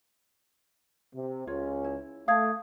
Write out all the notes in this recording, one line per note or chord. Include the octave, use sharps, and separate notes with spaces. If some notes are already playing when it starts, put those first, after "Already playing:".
C3
C#2 C#4 F4 C#5
E4
A3 F5 D#6 G#6